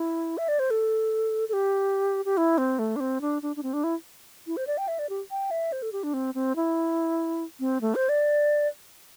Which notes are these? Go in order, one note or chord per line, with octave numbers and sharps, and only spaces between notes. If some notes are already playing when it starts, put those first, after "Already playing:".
Already playing: E4
E5
D5
C5
A4
A4
G4
G4
E4
C4
A3
D4
C4
D4
D4
D4
C4
D4
E4
E4
C5
D5
G5
E5
D5
G4
G5
E5
C5
A4
G4
D4
C4
C4
E4
C4
A3
C5
D5